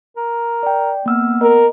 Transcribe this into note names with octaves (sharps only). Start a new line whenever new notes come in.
A#4
D5 G5
A#3 B3 E6 F6
A#4 D#5